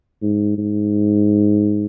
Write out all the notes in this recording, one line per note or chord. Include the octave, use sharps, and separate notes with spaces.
G#2
G#2